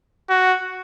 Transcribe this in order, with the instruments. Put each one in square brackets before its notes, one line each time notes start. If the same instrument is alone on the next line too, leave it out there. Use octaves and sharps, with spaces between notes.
[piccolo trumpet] F#4